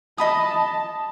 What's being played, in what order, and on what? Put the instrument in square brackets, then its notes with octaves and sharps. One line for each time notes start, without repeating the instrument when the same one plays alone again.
[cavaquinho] D#5 B5 D#6 [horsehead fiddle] A5